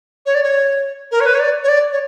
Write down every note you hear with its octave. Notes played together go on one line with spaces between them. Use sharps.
C#5
D5
C#5
A#4
C#5
B4
C#5
D5
C#5
D5
C#5